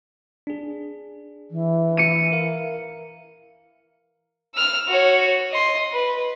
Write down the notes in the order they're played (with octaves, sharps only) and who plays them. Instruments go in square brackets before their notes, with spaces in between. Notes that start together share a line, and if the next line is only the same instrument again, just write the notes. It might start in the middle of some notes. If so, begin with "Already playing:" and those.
[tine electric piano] D4 G#4
[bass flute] E3
[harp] C#7 D#7
[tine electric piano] A#4 F5
[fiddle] E6 F6
F#4 C#5
D#5 C6
B4